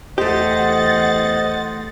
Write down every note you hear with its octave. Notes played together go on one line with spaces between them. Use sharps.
E2 A3 G4 C5 D#5 F#5 A6